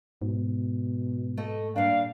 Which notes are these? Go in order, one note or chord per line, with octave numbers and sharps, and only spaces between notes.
G#2 B2
A3 A4 D#5
A#2 G3 D4 F5